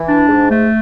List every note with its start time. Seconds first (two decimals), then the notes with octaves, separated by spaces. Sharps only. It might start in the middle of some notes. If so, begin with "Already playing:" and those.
Already playing: E3
0.08 D4
0.29 G#2
0.50 A3